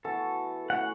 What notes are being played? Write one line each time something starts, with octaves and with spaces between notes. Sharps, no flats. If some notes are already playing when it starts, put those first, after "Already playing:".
E3 B3 F#4 A4
E3 A3 C#4 F#5